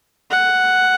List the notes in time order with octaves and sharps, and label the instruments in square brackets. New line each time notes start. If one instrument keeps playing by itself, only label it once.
[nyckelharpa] F#5